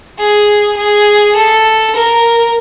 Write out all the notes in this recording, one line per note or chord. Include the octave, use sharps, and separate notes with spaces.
G#4
G#4
A4
A#4